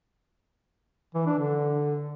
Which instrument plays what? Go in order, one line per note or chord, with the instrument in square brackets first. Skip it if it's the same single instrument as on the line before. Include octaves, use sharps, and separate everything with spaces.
[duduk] E3
D4
D3